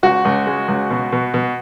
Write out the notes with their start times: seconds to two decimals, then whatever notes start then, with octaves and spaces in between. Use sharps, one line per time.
0.03 C#2 F#4
0.25 C#2
0.47 G#3
0.68 C#2
0.90 B2
1.12 B2
1.34 B2